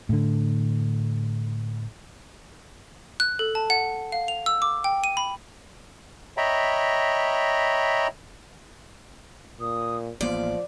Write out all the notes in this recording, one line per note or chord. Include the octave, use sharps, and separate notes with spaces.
A2 D3
F#6
A4
A5
F#5
F5
F7
E6
D6
G5
D#7
B5
C#5 D#5 E5 G5 A#5 B5
A#2 D#6
A1 F3 A#3 B3 F4 D5